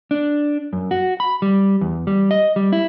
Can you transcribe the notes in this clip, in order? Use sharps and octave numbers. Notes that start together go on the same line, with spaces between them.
D4
F#2
F#4
B5
G3
E2
G3
D#5
G3
E4